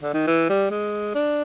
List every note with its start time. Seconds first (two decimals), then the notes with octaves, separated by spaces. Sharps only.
0.02 D3
0.14 D#3
0.27 E3
0.49 G3
0.70 G#3
1.15 D4